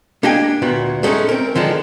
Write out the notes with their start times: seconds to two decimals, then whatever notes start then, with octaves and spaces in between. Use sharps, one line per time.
0.23 A#3 D4 G4 D#5 G5 G#5
0.62 D2 A#2 B3 F#4
1.03 G#3 A3 C4 C#4 D#4
1.29 C4 A#4
1.55 D3 D#3 F3 G#3 D4